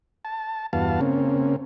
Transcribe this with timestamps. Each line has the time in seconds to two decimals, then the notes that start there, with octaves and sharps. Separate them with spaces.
0.25 A5
0.73 E2 G2 B3 F#4 F5 A5
1.01 C#3 A#3 C4 C#4